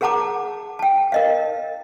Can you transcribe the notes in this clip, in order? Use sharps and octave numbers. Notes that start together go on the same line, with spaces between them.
G#4 A#4 F#5 A5 A#5 D6
G5 A5
A#4 D#5 F5